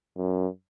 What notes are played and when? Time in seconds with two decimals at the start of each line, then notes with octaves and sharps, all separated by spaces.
0.17 F#2